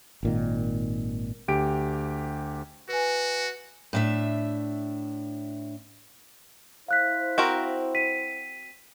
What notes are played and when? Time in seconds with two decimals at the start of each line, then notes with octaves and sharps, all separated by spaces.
0.23 G#1 A#2 D#3
1.48 D2 G4 D7
2.89 F#4 B4 G#5
3.93 A2 D4 E5
6.88 E4 C5 F5 F#6 B6
7.38 C4 F#4 A#4
7.95 B6 D#7